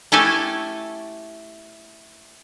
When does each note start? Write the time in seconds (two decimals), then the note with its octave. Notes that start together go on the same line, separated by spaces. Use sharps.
0.12 A3 C#4 E4 G4 A4 G#5